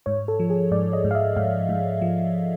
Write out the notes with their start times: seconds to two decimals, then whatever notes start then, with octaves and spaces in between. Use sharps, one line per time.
0.06 G#2 C#5
0.28 A4
0.40 F3
0.50 G#4
0.71 G#2 D5
0.93 D#5
1.04 G#2
1.11 F5
1.15 E5
1.36 G#2 F5
1.69 G#2
2.02 F3